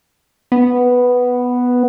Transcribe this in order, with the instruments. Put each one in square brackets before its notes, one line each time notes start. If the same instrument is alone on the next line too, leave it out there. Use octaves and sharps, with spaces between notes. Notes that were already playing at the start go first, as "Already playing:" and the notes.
[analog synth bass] B3